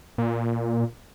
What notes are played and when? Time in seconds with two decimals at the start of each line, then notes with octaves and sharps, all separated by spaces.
0.18 A#2